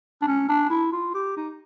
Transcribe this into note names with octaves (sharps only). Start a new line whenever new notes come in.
D4
C#4
D4
E4
F4
G4
D#4